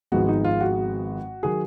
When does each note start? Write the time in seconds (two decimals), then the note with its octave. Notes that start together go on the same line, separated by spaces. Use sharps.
0.12 G#1 G#2 F3 G#3 B3 F#4
0.29 D#4
0.45 F4
0.61 F#4
1.43 D#3 F#3 G#4